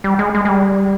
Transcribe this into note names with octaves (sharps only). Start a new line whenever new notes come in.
G3
G#3
G#3
G#3
G3